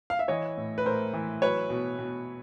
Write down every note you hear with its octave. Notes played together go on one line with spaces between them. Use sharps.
F5
E5
E3 C#5 D#5
A2
B4
A2 A#4 C5
E3
F#3 B4 C#5
B2
B2